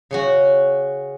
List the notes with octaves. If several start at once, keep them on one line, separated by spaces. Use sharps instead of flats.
C#3 C#4 F#4